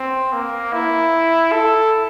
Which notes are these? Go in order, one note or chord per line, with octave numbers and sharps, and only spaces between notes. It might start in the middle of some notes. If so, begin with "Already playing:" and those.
Already playing: C4
A#3
E4
A4